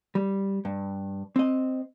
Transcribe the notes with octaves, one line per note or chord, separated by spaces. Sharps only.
G3
G2
C4 D#5